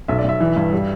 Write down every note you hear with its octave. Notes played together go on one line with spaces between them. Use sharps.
B1 E5
D5
B1 E5
E3
G2
G3